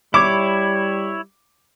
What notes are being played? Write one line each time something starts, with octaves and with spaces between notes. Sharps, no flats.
G3 E4 C#5 D6